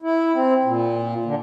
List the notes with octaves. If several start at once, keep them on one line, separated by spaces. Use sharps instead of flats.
E4
C4
A#2
D3